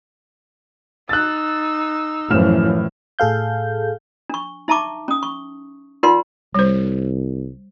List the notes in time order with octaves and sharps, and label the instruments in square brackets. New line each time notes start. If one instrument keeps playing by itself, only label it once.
[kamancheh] D#4 E6 [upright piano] F#6 A6
[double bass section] F#2 E3 F3 [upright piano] A2 F6 E7
[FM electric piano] A2 G#4 A4 F5 G6
[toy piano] D4 C#6
D#4 E5 A5 A#5 C#6 D6
C#4 D#6
C#6
D#4 F4 A#4 D5 F#5 C6
[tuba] C2 [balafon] G3 C5